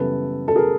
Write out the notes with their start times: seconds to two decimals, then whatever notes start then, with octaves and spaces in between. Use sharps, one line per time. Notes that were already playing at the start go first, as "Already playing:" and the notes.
Already playing: F#2 C#3 E3 G3 B3 A4 B4
0.48 A4
0.56 G#4 A#4